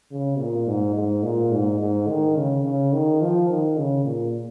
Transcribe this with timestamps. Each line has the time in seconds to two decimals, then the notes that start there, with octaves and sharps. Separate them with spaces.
0.11 C#3
0.39 A#2
0.67 G#2
0.95 G#2
1.23 A#2
1.52 G#2
1.80 G#2
2.08 D#3
2.36 C#3
2.64 C#3
2.93 D#3
3.21 F3
3.49 D#3
3.77 C#3
4.05 A#2